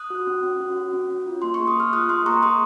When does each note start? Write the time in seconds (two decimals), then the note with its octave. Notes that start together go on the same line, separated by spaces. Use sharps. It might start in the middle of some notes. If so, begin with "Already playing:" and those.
Already playing: D#6 F#6
0.10 F#4
0.27 C#4
0.43 C#4
0.60 F#4
0.77 F#4
0.93 C#4
1.10 C#4
1.26 F4
1.42 A#3 C6
1.54 C#6
1.60 G#4
1.67 D#6
1.76 A#3 F6
1.93 F4 D#6 F#6
2.09 A#3 C6 D#6
2.26 G#4 A#5 C#6
2.42 A#3 C6 D#6